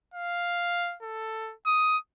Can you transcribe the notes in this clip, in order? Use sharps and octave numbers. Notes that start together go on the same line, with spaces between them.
F5
A4
D#6